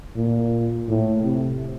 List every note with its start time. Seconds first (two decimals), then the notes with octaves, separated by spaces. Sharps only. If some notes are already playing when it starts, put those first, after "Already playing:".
0.16 A#2
0.88 A2
1.24 C3